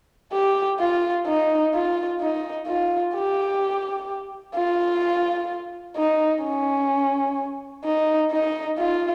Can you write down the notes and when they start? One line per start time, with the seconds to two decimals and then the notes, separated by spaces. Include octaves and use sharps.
0.33 G4
0.80 F4
1.27 D#4
1.74 F4
2.21 D#4
2.67 F4
3.14 G4
4.55 F4
5.97 D#4
6.44 C#4
7.85 D#4
8.32 D#4
8.79 F4